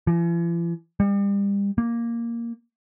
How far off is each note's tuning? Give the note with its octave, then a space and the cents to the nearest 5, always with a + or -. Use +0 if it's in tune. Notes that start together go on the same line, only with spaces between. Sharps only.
E3 +45
G3 +35
A#3 +0